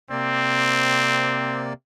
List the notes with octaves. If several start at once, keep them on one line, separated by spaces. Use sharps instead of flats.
C3 A#3 C4 D5